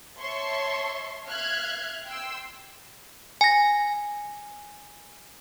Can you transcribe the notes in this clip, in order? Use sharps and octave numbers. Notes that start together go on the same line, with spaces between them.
C#5 E5 A5 C6 C#6
E5 F5 F6 F#6 G#6
G5 C6 E6
G#5 A#6